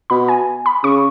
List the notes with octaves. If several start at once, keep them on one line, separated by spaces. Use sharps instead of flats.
B2 B5
G#5
B5
C#3 C#6